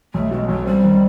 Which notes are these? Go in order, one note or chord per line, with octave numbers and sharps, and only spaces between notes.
B1 A3
B2 G#3
B1 F#3
G3 C4
D#3